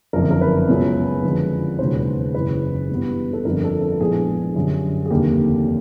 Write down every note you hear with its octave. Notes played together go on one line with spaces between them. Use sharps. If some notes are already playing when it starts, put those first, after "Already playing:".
F#1 F2 D3 A#4
A#4
B4
C#2 C#3 F#3 B3
F2 D3 F3 G#3
E1 D#2 C#3 F#3 C5
F#1 E2 C#3 B4
G2 E3 G3 B3
A4
G1 F2 D3 A#4
A4
A4
A#1 A2 F3 G#3 B3 G#4
F#2 D3 G3
G#4
F1 D#2 D3 G3 A#3 G4